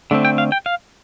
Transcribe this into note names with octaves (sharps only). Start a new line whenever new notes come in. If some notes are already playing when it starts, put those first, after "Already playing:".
D3 A3 C4
G5
F5
G5
F5